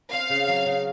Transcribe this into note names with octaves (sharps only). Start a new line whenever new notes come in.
C4 F5
C#3
F#3
C#3